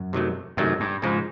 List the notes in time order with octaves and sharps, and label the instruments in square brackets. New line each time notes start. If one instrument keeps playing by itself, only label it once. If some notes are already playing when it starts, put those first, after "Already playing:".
Already playing: [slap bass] F#2
[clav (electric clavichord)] C3 D#3 F#3 A3
[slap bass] F#2 [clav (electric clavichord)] C3 D#3 F#3 A3
[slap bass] G2
[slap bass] G#2 [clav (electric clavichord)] C#3 F3 G#3